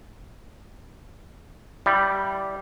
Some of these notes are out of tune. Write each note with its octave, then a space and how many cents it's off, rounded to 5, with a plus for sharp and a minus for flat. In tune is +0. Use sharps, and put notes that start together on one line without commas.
G3 -10 E4 +0